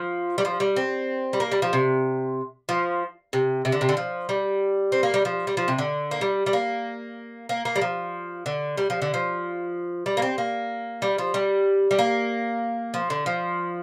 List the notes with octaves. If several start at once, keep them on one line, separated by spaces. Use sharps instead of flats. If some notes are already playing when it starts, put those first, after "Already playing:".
Already playing: F3
G3
F3
G3
C4
G3
A#3
G3
F3
C3
F3
C3
C3
D3
C3
D3
F3
G3
C4
A#3
G3
F3
G3
F3
C3
D3
A#3
G3
G3
A#3
A#3
A#3
G3
F3
D3
G3
F3
D3
F3
G3
A#3
C4
A#3
G3
F3
G3
G3
A#3
F3
D3
F3